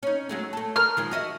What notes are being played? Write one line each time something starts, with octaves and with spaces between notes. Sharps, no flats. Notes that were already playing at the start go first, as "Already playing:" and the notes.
C#4 D#4
F#3 G#3 A3
A3 A4
A4 A#4 F6
D#3 F3 G#3
F#4 D#5 E5